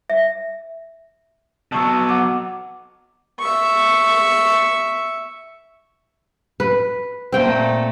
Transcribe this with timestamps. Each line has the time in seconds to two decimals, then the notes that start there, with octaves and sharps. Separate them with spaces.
0.10 E5
1.72 B2 F#3 A5 C#6 E6
2.09 F#5 D6
3.40 E5 C#6
6.60 B4
7.32 A#2 A3 C4 G5